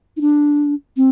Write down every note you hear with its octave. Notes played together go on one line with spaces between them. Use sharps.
D#4
D4
C4